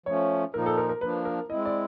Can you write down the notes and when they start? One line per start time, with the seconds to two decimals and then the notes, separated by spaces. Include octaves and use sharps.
0.06 F3 A3 C#4 C#5
0.54 A#2 F3 A#3 D#4 A#4
0.66 A4
0.78 A#4
0.89 A#4
1.01 F3 A#3 D4 B4
1.25 A#4
1.49 G#3 C4 E4 D#5
1.65 D5